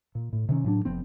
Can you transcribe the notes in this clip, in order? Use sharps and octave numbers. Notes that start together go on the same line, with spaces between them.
A#2
A2
C3 D#3 C#4
A2 F#3 D4
F1 F2 B3 C4